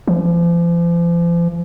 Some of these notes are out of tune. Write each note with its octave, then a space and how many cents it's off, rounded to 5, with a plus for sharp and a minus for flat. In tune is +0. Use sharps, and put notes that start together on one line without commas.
F3 -40